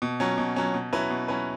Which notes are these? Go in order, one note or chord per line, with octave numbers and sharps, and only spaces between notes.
B2
F#3 C#4
B2
F#3 C#4
B2
F#3 C#4 E4 B4
B2
F#3 C#4 E4 B4